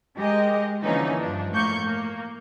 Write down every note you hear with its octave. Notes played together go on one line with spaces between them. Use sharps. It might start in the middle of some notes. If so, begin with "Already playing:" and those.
G#3 G4 A#4 D#5
D3 E3 F3 A#3 C#4 D#4
G2 F3 D4
A2 A#3 C#6 G6
A#3